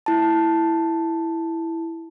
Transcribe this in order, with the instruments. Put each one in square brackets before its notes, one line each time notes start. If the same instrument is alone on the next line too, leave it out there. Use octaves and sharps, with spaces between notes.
[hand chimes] E4 A5